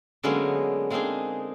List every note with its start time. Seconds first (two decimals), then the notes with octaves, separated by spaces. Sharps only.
0.23 D3 F#3 G#3 A#3 B3 C#4
0.90 G#3 A#3 C4 D4 D#4 G#4